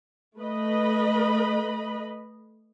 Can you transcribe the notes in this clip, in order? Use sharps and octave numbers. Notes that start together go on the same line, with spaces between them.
A3 B4 D#5 B5